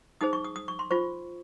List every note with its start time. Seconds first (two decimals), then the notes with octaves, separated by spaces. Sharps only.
0.21 D#4 G#4 C5 D#6
0.33 C#6
0.44 D#6
0.56 D#6
0.68 C#6
0.79 C6
0.91 F4 C5 C#6